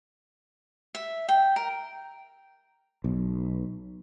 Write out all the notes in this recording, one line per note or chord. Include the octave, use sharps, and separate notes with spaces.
E5
G5
A#4
B1